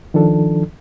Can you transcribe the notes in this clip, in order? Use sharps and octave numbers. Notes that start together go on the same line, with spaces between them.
D#3 F3 D4 A4